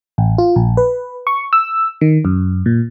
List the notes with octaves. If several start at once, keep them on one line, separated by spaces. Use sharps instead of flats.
A1
F4
A#1
B4
C#6
E6
D#3
F#2
A#2